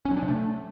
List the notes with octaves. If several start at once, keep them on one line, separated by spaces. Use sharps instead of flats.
C#4
F#3
D4
C3
A3